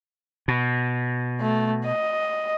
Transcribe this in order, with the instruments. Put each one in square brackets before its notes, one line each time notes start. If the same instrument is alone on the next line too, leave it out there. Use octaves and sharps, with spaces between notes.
[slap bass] B2
[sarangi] A3
D#5